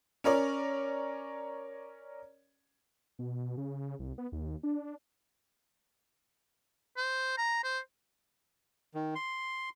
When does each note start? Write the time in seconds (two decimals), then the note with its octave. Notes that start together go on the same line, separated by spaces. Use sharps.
0.24 C#4 A#4 C#5 D5
3.19 B2
3.57 C#3
3.99 C2
4.18 B3
4.32 D#2
4.63 D4
6.97 C5
7.38 A#5
7.64 C5
8.94 D#3
9.15 C6